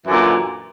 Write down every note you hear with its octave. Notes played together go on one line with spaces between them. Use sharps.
F#2 A#2 D3 E3